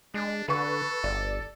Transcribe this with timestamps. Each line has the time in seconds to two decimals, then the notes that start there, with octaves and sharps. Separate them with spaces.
0.14 G#3 D4
0.48 D3 A4 B4 C#6
1.04 G1 D5